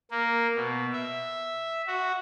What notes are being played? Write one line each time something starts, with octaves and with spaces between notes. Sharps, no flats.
A#3
B2
E5
F#4